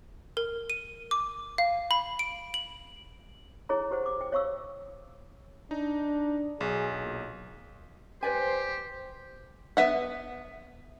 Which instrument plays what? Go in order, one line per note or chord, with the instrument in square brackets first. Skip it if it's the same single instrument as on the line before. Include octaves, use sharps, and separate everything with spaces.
[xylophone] A#4
D#7
D6
F5
B5
D7
F#7
[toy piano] E4 G#4 C#5 A#5
G4 C5 F#5
F#5 D6
G5
C#5 F5 C#6 E6
[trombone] D4 [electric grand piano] D#4
[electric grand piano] B1 [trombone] G#4
[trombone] A#2
[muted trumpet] G4 [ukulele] B4 D5 G#5 [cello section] C5
[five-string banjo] B3 B4 E5 F#5